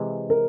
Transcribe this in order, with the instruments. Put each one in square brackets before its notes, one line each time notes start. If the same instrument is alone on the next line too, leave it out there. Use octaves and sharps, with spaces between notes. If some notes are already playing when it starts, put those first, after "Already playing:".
Already playing: [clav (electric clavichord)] C3 E3 G#3
[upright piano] A#4